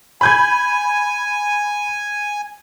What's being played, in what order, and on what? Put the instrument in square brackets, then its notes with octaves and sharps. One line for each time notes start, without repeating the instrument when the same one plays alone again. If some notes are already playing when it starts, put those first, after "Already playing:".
[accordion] G#5 [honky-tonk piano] B5 G6 G#6